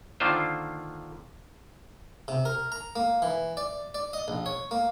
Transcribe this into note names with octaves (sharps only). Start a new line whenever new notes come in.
D3 D#3 A#3 D4 F4 C5
C3
A#4
A#5
A#3
E3
D5
D5
D#5
A#1
C#5
A#3